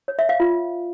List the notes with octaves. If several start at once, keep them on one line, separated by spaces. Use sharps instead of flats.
C#5
E5
F5
F4